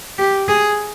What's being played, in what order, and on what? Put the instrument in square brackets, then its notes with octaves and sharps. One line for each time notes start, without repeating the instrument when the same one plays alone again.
[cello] G4
G#4